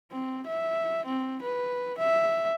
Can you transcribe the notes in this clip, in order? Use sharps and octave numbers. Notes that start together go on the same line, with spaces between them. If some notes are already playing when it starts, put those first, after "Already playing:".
C4
E5
C4
B4
E5